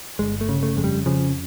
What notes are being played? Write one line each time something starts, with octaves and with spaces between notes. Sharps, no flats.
G1 G#3
A3
C#3
A3
F2 G#3
G3
C#3 F3